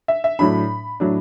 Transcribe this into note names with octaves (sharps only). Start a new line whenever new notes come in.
E5
E5
A2 F#3 D4 B5
A2 F#3 D4